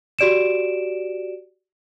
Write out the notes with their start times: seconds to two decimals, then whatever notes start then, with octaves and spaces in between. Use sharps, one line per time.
0.19 F#4 G4 D5 D7 E7